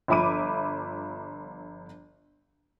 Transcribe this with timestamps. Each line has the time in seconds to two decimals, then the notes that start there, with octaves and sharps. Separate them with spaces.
0.08 G1 F3 E5 B5 D6 D#7